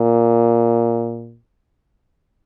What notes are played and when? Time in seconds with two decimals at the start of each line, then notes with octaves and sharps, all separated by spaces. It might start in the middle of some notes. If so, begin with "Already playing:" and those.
Already playing: A#2